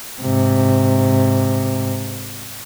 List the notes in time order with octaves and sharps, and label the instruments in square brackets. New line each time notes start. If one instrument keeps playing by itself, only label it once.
[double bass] G#2 C3